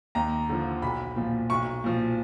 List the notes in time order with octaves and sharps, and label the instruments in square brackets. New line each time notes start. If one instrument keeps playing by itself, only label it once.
[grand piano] D#2 A#5
D3 F3
B1 B5
A#2 F3
B1 C#6
A#2 F3